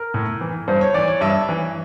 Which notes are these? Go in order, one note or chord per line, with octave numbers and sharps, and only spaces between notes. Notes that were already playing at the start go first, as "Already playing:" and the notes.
Already playing: A#4
A2
E3
G2 C5
C#5
E3 D5
C#5
G2 E5
E3